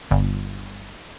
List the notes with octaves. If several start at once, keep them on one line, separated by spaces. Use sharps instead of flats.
G1